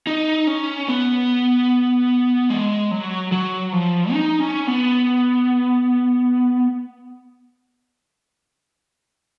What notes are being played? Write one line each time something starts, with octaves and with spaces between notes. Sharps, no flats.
D#4
C#4
B3
G#3
F#3
F#3
F3
D#4
C#4
B3